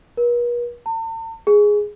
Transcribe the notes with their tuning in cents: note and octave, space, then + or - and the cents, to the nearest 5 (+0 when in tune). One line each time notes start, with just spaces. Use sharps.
B4 -45
A5 +45
G#4 +0